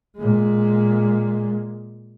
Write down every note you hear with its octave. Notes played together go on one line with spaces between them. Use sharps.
A#2 G#3